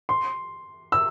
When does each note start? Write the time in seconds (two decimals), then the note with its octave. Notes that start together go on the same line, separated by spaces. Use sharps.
0.09 C6
0.92 E6